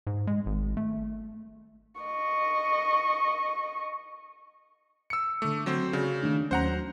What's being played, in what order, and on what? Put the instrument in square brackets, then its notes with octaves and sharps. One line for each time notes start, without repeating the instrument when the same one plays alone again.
[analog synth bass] G#2
G#3
G#1
A3
[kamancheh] D#5 C#6
[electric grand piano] E6 C#7
[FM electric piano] D3 D6 [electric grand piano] A3
[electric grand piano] F#3 C4 C5
[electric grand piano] C#3 [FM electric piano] F#4 D5
[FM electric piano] D#3 A3 D4
[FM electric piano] D#2 F#3 C#4 [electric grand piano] C5 F#5 A#5